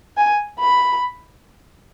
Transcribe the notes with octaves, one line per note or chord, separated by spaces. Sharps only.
G#5
B5